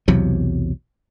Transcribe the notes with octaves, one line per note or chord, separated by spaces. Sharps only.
B1 E2 C3 F#3